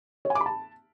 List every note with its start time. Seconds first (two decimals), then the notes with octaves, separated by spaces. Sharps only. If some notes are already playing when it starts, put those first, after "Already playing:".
0.25 C#5
0.30 G#5
0.35 D6
0.41 B5
0.46 A5